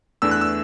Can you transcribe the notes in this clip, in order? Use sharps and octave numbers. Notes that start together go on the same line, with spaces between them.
E2 E3 A3 D4 E6
F#6
E6